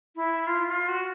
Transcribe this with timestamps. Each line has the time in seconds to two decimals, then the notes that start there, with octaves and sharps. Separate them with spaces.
0.16 E4
0.47 F4
0.68 F4
0.88 F#4